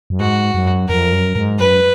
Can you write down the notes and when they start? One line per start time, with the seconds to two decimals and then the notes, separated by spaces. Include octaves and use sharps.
0.10 F#2
0.20 G#2 F#4
0.54 F#2
0.89 F2 A#4
1.12 F#2
1.36 G#2
1.59 F#2 B4